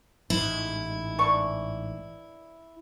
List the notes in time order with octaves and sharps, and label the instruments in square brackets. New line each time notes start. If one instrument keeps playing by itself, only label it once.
[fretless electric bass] A1 G#2 [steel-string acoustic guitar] E4
[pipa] E3 D4 C#6